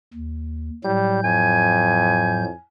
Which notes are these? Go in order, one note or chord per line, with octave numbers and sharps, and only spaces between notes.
D#2
A2 F#3 G3 G6
F2 G#5